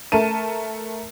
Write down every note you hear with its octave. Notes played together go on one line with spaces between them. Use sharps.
A3 A#4 A5 D#7